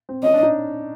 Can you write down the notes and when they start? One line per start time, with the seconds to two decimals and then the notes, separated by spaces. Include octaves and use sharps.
0.09 C4
0.23 C#4 D#5
0.34 D4
0.43 D#4